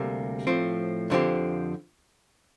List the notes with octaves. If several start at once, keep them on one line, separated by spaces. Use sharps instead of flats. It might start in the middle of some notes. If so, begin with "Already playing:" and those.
Already playing: D2 C3 G3 A#3
A2 F3 C4
F2 D3 F3 C4 G4